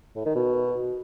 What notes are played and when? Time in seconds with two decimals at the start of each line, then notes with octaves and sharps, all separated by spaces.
0.15 A2
0.25 D#3
0.35 B2